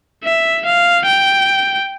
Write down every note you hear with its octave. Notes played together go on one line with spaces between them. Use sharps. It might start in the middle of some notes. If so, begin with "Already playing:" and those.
E5
F5
G5